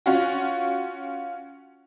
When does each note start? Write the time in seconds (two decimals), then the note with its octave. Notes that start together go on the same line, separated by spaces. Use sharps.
0.06 C#4 F4 F#4